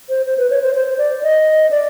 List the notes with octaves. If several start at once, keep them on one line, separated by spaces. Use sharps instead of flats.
C5
C5
B4
C#5
C5
C5
D5
D#5
D5